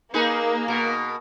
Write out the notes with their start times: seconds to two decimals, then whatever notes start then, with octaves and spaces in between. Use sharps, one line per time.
0.14 A#3 D#4 G#4 B4
0.68 B2 A#4